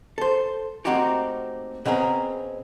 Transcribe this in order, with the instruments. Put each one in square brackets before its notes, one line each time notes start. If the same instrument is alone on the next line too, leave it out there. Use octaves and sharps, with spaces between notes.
[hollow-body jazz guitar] A4 C5
A3 A#3 C4 D#4 F#4 G4
B2 C4 C#4 G#4 A#4